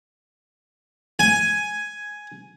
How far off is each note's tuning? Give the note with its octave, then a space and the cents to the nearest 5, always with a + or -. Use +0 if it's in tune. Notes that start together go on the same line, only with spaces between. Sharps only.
G#5 +5